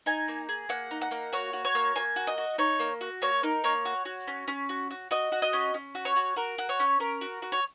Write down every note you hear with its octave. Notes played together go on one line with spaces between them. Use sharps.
D#4 G#5
A#3
G#4
A#3 F#5
D#4
F#5
A#3
F#4 C#5
F#4
C#5
A#3
A#3 G#5
F#4
D#5
F#4
D#4 C#5
A#3
F#4
A#3 C#5
D#4 A#4
A#3 C#5
F#4
F#4
C#4
C#4
F#4
F#4
F#4 D#5
F#4
D#5
C#4
C#4
F#4
C#5
F#4
F#4 A#4
F#4
C#5
C#4
C#4 A#4
F#4
F#4
C#5